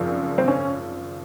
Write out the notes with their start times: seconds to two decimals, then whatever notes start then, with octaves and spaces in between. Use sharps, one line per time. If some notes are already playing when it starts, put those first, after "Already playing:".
Already playing: G#1 F#2 C#3 F3
0.38 C4
0.48 C#4